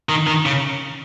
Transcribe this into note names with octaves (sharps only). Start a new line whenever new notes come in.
D#3
D#3
C#3